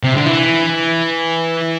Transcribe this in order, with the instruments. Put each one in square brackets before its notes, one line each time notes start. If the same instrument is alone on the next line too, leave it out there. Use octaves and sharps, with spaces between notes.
[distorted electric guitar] C3
D3
E3